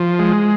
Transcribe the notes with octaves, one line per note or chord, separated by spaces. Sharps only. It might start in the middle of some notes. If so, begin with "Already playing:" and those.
Already playing: F3
G#3